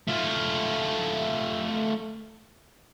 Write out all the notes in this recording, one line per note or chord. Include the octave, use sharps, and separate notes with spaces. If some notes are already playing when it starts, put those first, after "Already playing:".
A3 F4